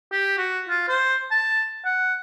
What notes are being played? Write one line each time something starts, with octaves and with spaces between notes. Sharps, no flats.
G4
F#4
F4
C5
A5
F#5